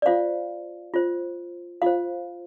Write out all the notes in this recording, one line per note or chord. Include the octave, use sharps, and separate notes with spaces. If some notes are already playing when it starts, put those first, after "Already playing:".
D5
F4 C5 F5
F4 C5
F4 C5 F5